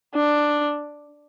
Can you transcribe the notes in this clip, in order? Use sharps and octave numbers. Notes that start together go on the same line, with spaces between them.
D4